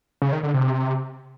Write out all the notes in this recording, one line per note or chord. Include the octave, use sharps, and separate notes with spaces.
C#3
D#3
D3
C3